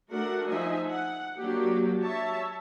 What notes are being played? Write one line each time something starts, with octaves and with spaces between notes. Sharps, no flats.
A3 D4 F#4 A#4 F#5
F3 D#4 D#5 E5 G#5
F#5
F#3 A#3 D4 G4
C#5 E5 A5